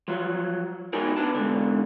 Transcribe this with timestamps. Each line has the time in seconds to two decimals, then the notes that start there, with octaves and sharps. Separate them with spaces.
0.08 F3 F#3
0.93 D#4 F#4 G#4 A#4
1.17 B3 D4 A5
1.35 G#2 D3